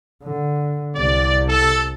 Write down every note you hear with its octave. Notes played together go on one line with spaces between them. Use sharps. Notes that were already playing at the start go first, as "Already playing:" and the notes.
D3
C2 C3 D5
A4